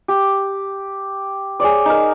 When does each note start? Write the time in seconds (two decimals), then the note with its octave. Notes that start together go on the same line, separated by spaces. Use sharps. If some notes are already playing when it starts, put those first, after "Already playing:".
0.08 G4
1.60 G#4 C#5 D5
1.86 D#4 A#4